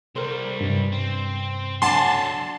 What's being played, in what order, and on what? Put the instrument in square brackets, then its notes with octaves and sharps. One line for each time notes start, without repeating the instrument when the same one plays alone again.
[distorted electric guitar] C2 G3 [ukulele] A#4 C5
[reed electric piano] G2 C3
[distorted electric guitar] C4
[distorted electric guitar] F#3 A4 [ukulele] D4 F#5 G#5 [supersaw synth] A5 C6